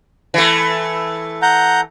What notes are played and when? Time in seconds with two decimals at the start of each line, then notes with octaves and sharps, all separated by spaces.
0.34 E3 A3
1.42 F#5 A#5 G6